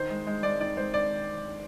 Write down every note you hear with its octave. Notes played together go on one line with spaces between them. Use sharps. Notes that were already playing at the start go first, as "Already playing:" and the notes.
Already playing: D#3 C5
G#3
G#3
G#3 D5
D#3 D5
G#3 C5
D5